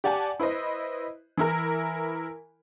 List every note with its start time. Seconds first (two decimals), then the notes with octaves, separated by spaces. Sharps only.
0.04 G4 D5 F#5 G#5 A5
0.40 E4 B4 C5 D#5
1.37 E3 E4 A#4